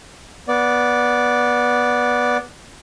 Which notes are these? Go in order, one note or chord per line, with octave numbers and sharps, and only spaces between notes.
B3 D5